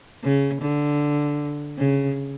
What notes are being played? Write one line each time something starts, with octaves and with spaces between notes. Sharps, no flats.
C#3
D3
C#3